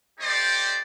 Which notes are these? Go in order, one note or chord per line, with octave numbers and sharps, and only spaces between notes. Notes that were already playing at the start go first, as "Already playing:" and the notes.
A3 D#4 G4 C5 D5